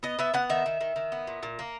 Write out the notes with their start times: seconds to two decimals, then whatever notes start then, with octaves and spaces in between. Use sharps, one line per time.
0.03 B3 D#5
0.19 B3 E5
0.34 B3 F#5
0.50 D#3 E5
0.66 D#3
0.81 D#3
0.96 D#3
1.12 B3
1.27 A#2
1.43 A#2
1.59 A#3